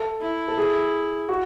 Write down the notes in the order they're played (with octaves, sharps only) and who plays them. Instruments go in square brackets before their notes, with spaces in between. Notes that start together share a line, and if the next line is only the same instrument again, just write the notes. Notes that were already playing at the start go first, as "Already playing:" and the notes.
Already playing: [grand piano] A4
[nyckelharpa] E4
[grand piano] A4
G#4
F#4